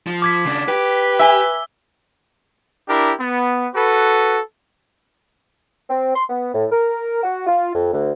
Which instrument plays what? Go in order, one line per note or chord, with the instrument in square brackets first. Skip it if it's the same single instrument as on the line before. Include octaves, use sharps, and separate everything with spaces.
[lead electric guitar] F3
[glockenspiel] D6 G#6 B6
[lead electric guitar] C#3 D4
[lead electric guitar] G4 [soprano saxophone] B4
[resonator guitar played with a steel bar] E5 G#5 [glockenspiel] E6 G7
[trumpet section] D4 E4 G4 A#4
B3
F#4 A4 B4
[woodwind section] C4
C6
B3
A2
A#4
F#4
F4
F2
D2